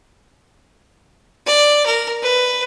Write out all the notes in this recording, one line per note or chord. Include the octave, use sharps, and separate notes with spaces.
D5
A#4
B4